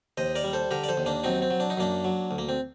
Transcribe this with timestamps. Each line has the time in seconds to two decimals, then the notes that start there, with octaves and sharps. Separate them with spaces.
0.17 D#2 C5 D#5
0.35 A#4 D5
0.44 G3
0.53 A4 C5
0.71 D3 G4 A#4
0.84 D5
0.89 A4 C5
0.97 D#2
1.06 A#3 D4
1.24 F#3 C4 D#4
1.42 C4
1.50 F#3
1.60 D4
1.70 D#4
1.77 F#2 A#3 D4
2.04 F#3
2.31 D2
2.38 A#3
2.49 C4